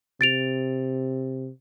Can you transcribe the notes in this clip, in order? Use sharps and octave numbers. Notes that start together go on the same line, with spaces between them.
C3 A6 D7 F7